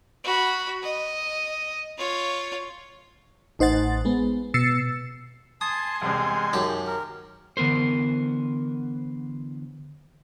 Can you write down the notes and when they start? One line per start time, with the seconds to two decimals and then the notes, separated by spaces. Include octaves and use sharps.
0.24 F#4 B5
0.83 D#5
1.98 F4 C#5
3.59 A1 D#4 C5 F#5 A6
4.05 G#3 B3
4.54 B2 E6 A6 C7 C#7
5.61 G#5 A5 C6 D#6
6.02 E1 C2 C3 G#3
6.53 F#2 D#3 G4 A5
6.87 A#4
7.57 D3 E3 B3 A#4 C5